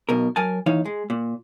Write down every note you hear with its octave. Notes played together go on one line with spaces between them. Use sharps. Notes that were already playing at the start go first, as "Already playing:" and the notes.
B1 B2 A#4
F#3 A#4 G#5 A5
D#2 E3 D#4 C#5 F5
G#3
A#2